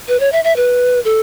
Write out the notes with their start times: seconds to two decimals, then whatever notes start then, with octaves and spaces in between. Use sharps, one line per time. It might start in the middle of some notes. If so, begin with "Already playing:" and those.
0.08 B4
0.20 C#5
0.32 E5
0.44 E5
0.56 B4
1.05 A4